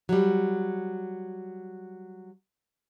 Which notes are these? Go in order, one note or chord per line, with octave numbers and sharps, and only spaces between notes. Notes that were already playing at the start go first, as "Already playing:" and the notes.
F#3 G3